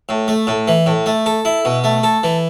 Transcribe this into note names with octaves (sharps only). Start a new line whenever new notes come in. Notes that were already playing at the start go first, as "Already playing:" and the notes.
A2
A3
A2
E3
A2
A3
A4
E4
B2
A3
A4
E3